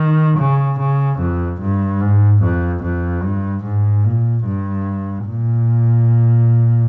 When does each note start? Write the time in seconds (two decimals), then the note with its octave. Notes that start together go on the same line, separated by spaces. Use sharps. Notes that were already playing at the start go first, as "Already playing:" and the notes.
Already playing: D#3
0.38 C#3
0.79 C#3
1.19 F2
1.61 G2
2.00 G#2
2.42 F2
2.83 F2
3.23 G2
3.64 G#2
4.04 A#2
4.45 G2
5.27 A#2